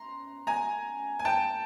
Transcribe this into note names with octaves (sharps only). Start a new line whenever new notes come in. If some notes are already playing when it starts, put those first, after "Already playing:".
Already playing: A#5 C6
G#5 A#5
G#5
G5 A5